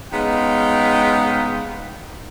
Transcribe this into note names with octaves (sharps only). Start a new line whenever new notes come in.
G#3 B3 C#4 D#4 F5 G5